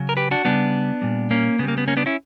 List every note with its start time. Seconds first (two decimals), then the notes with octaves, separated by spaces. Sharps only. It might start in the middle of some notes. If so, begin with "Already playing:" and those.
Already playing: C#3 F#3
0.09 A#4
0.17 G4 B4
0.31 D4 F#4
0.45 C#3 G3 B3 D4
1.02 A#2 G3
1.31 A#3 C#4
1.59 C#3 B3
1.63 G3
1.68 A#3
1.78 B3
1.88 A#3 C#4
1.97 B3 D4
2.06 C#4 E4